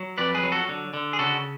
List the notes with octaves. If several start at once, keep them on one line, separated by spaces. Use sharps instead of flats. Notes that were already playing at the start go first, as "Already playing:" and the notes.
Already playing: F#3
F2 B4 D5
G#4 B4
F#3
F#4 A4
D3
D3
G#4
C#3 F#4 A4